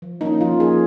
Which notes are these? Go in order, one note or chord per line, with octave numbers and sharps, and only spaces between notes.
F3
A#3 C#4 D#4
F3 F4
A#3 C#4 G#4